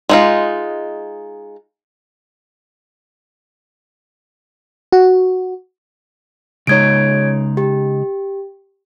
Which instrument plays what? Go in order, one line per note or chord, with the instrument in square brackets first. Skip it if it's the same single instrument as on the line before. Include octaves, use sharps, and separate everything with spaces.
[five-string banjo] G#3 D#4 F4
[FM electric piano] F#4
[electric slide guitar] C#3 G#3 D#4 [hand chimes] C#5 G#6 D7
[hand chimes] G4